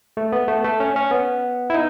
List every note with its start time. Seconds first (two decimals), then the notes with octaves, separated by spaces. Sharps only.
0.17 A3
0.32 B3
0.48 A3
0.64 A3
0.80 C#4
0.96 C#4
1.11 B3
1.70 E4
1.74 D#4